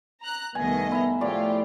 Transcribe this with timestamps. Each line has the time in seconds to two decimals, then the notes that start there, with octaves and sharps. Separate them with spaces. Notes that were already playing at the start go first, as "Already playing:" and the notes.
0.22 A#5 F#6
0.55 C2 D#3 A3 B3 D#5 G#5
0.92 E4 A#5
1.21 A2 F3 F4 G4 D5